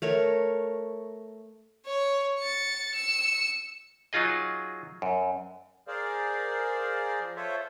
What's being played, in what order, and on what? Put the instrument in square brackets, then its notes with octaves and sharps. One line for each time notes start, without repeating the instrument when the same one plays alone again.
[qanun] A3 A#4 C#5
[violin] C#5
A6 C#7
E6 C#7
[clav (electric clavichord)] F#3 D#4 F4 G#4 D#5
F#2
[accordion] G#4 A#4 C5 D5 F5
F3
F4 A4 C5 C#5 E5